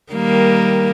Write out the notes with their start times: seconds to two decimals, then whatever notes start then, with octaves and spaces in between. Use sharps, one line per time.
0.12 D#3 G3 A#3